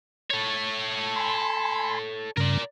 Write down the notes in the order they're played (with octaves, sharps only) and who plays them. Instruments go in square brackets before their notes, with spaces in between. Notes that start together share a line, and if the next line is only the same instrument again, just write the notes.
[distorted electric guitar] A4 C#5
[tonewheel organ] G#5 B5 C6
[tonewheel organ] G2 C#3 [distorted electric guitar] A#4 D5